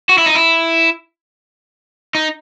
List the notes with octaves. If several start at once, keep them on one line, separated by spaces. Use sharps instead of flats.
F#4
E4
D#4
E4
D#4